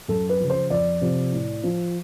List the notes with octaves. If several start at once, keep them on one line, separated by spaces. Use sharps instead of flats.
F#2 A4
B4
C#3 F3
C5
F2 D5
C3 F3
A2
F3